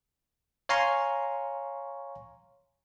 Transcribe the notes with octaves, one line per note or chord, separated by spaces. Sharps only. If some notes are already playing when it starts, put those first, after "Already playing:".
C#5 F5 G#5 A#5 C6 C#6